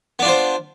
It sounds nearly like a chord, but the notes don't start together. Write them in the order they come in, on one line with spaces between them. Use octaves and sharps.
B3 D4 F4 C5